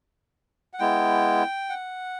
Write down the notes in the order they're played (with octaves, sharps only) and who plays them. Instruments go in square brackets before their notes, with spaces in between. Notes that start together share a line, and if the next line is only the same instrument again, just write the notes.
[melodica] F#5
G#3 B3 E4 G5
F#5